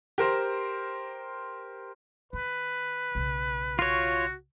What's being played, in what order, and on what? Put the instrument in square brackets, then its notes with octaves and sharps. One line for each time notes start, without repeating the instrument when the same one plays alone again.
[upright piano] G4 A#4 C5
[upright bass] D#3 [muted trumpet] B4
[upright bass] B1 C#3
[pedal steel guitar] F4 C#5 [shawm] F#4